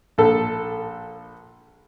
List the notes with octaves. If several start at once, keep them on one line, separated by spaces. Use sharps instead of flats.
A#1 A4